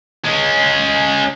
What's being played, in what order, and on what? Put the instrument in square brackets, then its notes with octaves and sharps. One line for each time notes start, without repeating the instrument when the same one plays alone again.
[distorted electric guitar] G#3 C#4